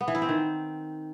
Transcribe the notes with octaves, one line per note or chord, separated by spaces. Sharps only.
B3
E3
E4
C4
D#3